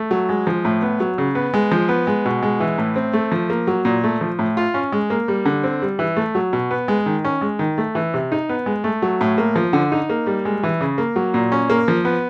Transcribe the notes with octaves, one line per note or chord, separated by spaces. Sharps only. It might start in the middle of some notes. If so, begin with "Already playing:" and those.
Already playing: A3
F#3
G#3
F3
A2
B3
F#3
C#3
B3
G#3
F3
B3
G#3
B2
G#3
E3
A2
C4
A3
F3
A#3
F#3
A#2
A3
F3
A2
F4
C#4
G#3
A#3
G3
D3
C4
G3
E3
A3
F#3
B2
B3
G#3
D#3
C#4
G#3
D#3
A3
E3
C3
D#4
B3
G#3
A3
F#3
A2
A#3
F3
D3
D#4
A#3
G3
G#3
E3
C#3
A#3
F#3
A#2
C#4
A#3
F3
B3